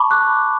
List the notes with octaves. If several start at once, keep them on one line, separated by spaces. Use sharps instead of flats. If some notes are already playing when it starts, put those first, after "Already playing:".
Already playing: A5 B5 C#6 D6
D6 F#6